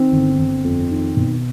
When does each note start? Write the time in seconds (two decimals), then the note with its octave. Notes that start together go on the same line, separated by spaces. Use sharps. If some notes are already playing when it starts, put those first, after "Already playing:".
Already playing: D#3 C4
0.12 G1
0.39 G1
0.64 F2
0.91 D#3
1.17 B2